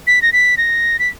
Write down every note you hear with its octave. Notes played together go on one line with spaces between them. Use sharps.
B6
A#6
B6
A#6
B6